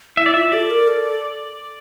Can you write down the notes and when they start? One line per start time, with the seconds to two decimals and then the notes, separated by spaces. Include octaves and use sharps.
0.17 E4 E5
0.26 D5
0.34 F4 E5
0.52 A4 D5
0.70 A#4
0.88 A4